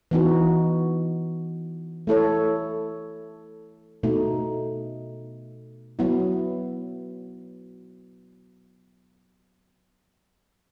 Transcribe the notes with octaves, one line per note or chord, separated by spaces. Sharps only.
E3 B3 D#4 F#4
A3 E4 A4 C#5
B2 A3 D#4
F#3 B3 E4